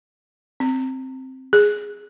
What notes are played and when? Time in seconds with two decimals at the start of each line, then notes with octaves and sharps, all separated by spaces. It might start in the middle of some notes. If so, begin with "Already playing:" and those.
0.60 C4
1.53 G#4